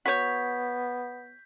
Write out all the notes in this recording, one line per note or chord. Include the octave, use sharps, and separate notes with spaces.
B3 F#4 C#5 G6 B6